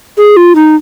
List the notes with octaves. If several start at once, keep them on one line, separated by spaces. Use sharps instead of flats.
G#4
F4
D#4